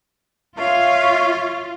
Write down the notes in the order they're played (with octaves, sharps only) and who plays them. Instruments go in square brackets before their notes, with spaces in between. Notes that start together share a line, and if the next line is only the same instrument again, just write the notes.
[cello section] F4 [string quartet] C#5 E5 F5